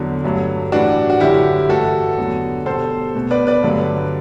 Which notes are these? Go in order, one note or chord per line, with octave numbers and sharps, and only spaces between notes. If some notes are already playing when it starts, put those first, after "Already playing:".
Already playing: E2 D3 F#3
G2 F#3 A3
A2 E3 G3 D4 F#4
F#4
F#2 D3 G3 E4 G4
G2 E3 A3 F#4 A4
E2 D3 F#3 A3
B2 G3 A4 C5
B2 A3
B4 D5
B4 D5
G2 D3 F#3 A3